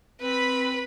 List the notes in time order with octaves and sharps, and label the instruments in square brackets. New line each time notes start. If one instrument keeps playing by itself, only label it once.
[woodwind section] C4 [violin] B4 B5